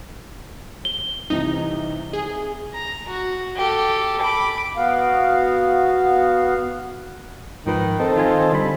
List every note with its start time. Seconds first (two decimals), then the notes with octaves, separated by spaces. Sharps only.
0.85 G7
1.30 C2 C3 E3 D#4
2.13 G#4
2.74 A#5
3.09 F#4
3.56 G4 A4
4.21 B5 D6
4.77 B3 F#4 F5
7.66 G#2 D#3 F3 B4
8.00 C4 D#4 A4
8.16 D#3 F4 G#5
8.52 D3 G3 B5